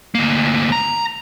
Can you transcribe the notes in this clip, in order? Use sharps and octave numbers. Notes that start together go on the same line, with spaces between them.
D2 A#3
A#5